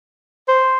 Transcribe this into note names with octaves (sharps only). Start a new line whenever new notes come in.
C5